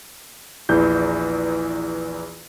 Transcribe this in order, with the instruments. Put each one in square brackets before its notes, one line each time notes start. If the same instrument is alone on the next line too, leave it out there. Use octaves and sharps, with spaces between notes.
[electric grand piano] A#1 E2 E3 G6